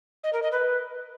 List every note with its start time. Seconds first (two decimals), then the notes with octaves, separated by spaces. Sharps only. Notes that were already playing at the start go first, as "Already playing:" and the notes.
0.24 D#5
0.33 A#4
0.43 D#5
0.52 B4